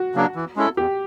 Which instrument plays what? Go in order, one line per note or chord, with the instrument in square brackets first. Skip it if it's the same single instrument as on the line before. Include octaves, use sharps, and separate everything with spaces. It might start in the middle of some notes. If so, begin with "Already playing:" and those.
Already playing: [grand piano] F#4
[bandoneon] C#3 F#3 A#3 D4
E3
G#3 C#4 E4 A4
[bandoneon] E2 [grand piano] G4